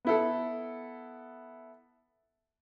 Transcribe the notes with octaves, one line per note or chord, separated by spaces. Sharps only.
B3 E4 A4